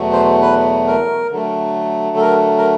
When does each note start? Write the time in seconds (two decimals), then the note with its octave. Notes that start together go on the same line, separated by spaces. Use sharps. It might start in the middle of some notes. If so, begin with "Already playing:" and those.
Already playing: E2 B2 F#3 A3
0.13 C5
0.41 B4
0.87 A#4
1.32 D3 F#3 A3
2.16 A4
2.21 A#4
2.58 A#4